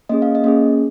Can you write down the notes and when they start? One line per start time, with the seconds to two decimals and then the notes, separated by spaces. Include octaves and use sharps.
0.09 A#3 C#4 G#4 D#5
0.22 F5
0.35 D#5
0.44 A#3 C#4 G#4